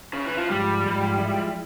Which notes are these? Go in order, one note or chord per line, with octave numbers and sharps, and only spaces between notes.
C#3
E3
F3
G#2 F3 G3 G#3
G#2 F3 G#3
F3 G#3 E4